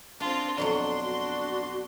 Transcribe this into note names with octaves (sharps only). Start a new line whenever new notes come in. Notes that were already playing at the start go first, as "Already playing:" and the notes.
C4 D4 F4
F2 B2 F#3 D4 C6
F#4